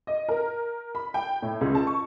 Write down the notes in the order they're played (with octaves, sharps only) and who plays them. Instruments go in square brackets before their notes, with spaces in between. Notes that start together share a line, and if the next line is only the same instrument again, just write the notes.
[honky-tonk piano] D#5
A#4
B5
G5
A2
C#2
A5
C#6